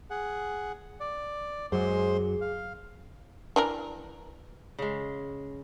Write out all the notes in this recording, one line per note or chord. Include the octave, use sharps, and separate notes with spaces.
G#4 F#5
D5
F#2 F#3 G#3 G#4 C5 C6
F5
E3 D4 A#4
C#3 G#3